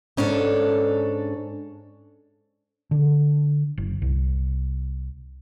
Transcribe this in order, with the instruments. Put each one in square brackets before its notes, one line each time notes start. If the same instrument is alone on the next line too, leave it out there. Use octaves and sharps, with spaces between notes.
[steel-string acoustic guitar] G#2 C#4 D4 A4
[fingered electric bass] D3
F#1
C2